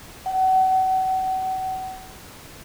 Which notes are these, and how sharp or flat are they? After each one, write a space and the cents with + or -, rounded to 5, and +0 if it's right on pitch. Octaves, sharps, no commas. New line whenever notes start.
F#5 +35